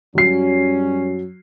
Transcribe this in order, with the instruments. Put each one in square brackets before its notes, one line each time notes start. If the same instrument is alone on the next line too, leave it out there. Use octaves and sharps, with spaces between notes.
[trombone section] F#2 G3 C#4 [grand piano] F#3 C7